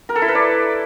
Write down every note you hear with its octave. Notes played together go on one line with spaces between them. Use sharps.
A#4
A4
E4
B4
D5